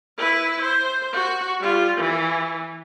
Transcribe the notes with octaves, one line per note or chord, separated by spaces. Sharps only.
E4 B4
C5
F#4
G3 F4
E3